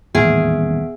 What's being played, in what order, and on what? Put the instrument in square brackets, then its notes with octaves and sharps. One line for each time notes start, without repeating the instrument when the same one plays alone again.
[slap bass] D#1 [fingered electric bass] E2 A2 [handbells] B3 E5 D7 [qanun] G#4